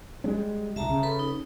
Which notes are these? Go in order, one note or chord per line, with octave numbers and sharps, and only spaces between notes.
G3 G#3 C#4
D#1 C2 E5 A5 A#5
C#3
A4 B4 B5
D#4